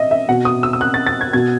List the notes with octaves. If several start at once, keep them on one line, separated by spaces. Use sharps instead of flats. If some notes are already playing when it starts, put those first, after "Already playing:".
Already playing: D#5 E5
E5
B2 F#5
D#6
E6
E6
F#6
A6
A6
G#6
B2 G#6